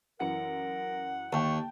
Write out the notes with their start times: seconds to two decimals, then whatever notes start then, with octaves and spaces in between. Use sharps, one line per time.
0.20 F#2 E3 A#4 F#5 C#7
1.33 D#2 G5 A5 C#6